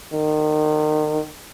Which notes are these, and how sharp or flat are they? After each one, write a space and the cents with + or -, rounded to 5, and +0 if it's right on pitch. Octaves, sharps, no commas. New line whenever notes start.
D#3 -30